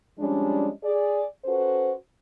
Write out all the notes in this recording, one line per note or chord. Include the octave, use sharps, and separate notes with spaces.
F3 G3 G#3 C#4 D4
G#4 D5
C#4 F#4 A4 B4 C5